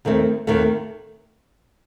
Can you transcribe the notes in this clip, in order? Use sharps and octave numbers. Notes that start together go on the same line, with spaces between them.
D#2 D#3 A3 C4
D#2 D#3 A3 C4